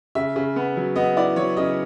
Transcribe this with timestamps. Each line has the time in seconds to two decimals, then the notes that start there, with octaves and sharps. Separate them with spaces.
0.15 C#3 E5
0.36 C#3
0.56 B3
0.77 F#3
0.96 B3 D#5
1.17 E4 D5
1.36 F#3 C#5
1.57 C#3 D#5